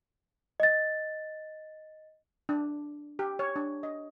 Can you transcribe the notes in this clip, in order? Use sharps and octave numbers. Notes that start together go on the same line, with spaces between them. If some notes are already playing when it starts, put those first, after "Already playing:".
D#5 A6
D4
G4
C#5
D4
D#5